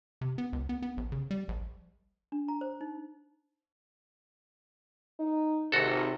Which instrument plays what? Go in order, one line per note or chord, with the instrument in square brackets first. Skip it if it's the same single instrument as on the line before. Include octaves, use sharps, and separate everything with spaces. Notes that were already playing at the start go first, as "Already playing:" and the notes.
[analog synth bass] C3
B3
C#2
B3
B3
A#1
C#3
G3
A#1
[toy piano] D4
A#5
C5
D#4
[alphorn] D#4
[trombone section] G#1 [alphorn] C3 [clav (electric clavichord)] F#4 A4